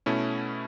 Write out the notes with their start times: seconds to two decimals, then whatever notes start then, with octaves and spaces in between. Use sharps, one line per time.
0.06 B2 A3 C#4 E4